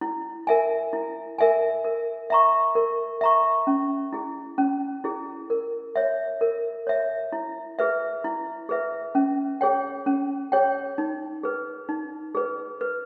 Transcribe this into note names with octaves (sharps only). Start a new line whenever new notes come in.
E4
A#4 E5 G#5
E4
A#4 E5 G#5
A#4
E5 A#5 C#6
A#4
E5 A#5 C#6
C#4
E4 G#4
C#4
E4 G#4
A#4
C#5 E5
A#4
C#5 E5
E4
G#4 B4 E5
E4
G#4 B4 E5
C#4
G#4 C#5 G5
C#4
G#4 C#5 G5
D#4
G#4 B4
D#4
G#4 B4
B4